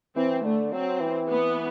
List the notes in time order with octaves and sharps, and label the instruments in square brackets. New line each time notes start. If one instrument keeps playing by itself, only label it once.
[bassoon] E3 [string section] C4
[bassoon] D3 [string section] A3
[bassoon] F#3 [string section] C4
[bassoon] E3
[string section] B3